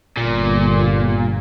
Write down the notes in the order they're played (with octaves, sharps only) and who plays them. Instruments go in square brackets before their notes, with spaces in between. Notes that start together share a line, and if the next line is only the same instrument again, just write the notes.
[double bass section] G1 [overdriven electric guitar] A#2